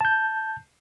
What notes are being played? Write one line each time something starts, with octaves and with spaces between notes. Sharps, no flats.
A5 G6